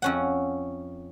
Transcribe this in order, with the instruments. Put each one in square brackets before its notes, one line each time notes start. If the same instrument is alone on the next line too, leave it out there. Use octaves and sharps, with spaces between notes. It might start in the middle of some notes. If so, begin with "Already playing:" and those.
[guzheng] F2 C#4 F#5